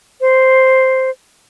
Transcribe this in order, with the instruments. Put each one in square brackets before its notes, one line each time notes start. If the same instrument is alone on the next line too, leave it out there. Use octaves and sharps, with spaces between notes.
[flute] C5